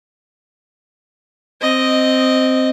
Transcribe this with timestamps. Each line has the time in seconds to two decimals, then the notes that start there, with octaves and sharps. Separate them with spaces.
1.61 C4 D#5